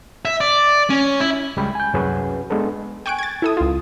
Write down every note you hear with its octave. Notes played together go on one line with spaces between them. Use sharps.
E5
D5
C#4
E4
C#2 G3 G#3 G5 B5
G#5 G6
C2 F#2 C#4 F#4 G#4 B4
G#3 B3 D4 A4 B4
G5 G#5 C#6 F#6 D7
G#6 A6
E4 A4 D#6
C#2 F4